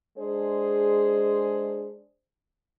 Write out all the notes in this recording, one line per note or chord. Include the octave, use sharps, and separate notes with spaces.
G#3 D4 G#4 C5